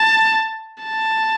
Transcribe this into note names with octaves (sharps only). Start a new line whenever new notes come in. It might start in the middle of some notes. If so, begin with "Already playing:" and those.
Already playing: A5
A5